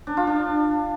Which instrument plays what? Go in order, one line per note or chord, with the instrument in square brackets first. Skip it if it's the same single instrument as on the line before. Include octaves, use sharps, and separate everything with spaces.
[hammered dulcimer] D4
F4
D4